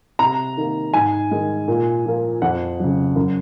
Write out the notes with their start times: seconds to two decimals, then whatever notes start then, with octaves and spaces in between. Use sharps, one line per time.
0.19 C3 A#5
0.57 D#3 A#3
0.94 G#2 G#5
1.31 D#3 G#3
1.68 A#2
2.06 F3 A#3
2.42 F2 F#5
2.80 C#3 F#3
3.16 F#2